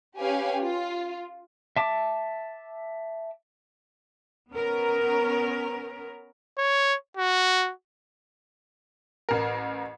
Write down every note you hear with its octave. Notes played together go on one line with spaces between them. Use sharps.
C#4 G4 B4 F5 G#5
F4
E5 A5 D6
B3 C#4 A#4
C#5
F#4
A1 A#4